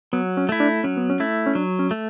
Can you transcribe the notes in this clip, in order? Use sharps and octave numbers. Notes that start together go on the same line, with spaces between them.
F#3 B3
C#4
A3 E4
D4
F#3 C#4
B3
C#4
A3 E4
C#4
F#3 D4
C#4
A3